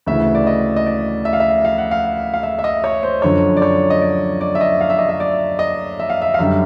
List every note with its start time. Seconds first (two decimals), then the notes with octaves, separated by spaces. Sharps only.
0.06 D2 C#3 E3 E5
0.35 D5
0.47 D#5
0.76 D#5
0.86 D5
1.25 E5
1.33 F5
1.40 E5
1.65 F5
1.78 F#5
1.91 F5
2.34 F5
2.43 E5
2.59 E5
2.64 D#5
2.84 C#5
3.03 C5
3.22 F#2 D3 F3 C#5
3.57 D5
3.62 C#5
3.90 D#5
4.01 D5
4.41 D5
4.55 E5
4.61 D#5
4.81 F5
4.90 E5
4.99 D#5
5.09 E5
5.20 D5
5.59 D#5
6.00 E5
6.10 F5
6.22 E5
6.34 F5
6.39 F#2 D3 G3 E5